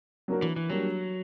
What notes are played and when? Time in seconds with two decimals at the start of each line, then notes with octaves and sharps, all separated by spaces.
0.28 F#3 A#3 D4 F#4 A#4
0.42 E3
0.56 E3
0.70 F#3 G3 A#3 D4